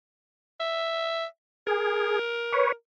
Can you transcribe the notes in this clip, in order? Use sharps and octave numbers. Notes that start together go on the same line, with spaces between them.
E5
G#4 A#4
B4 C#5